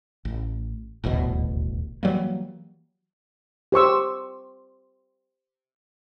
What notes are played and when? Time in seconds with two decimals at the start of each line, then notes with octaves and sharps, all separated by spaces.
0.25 A1
1.04 D#1 A1 D2 B2
2.03 E3 F#3 G3 A#3
3.72 G4 C5 C#6 E6